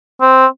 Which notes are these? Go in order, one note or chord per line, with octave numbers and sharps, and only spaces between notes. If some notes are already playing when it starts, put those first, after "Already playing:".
C4